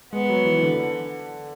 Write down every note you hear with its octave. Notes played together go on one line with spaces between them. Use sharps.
G#3 B3
F#3
E3
E3
D3